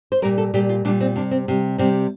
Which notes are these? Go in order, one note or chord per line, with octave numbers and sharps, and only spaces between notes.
C5
A#2 G3 A#4
A4
A#2 G3 G4
F4
A#2 G3 D4
C4
C3 G3 D4
C4
C3 G3
C3 G3 C4